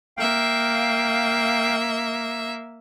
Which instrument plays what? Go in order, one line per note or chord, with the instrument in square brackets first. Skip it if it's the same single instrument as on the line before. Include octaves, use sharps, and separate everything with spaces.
[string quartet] A#3 E5 [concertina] F5 G5